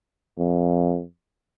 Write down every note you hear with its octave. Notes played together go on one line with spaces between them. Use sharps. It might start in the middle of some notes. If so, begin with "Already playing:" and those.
F2